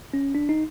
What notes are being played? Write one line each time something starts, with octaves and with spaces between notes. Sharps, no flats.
C#4
D4
D#4